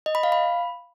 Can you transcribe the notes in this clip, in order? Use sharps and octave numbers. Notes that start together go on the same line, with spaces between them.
D#5
B5
F5
B5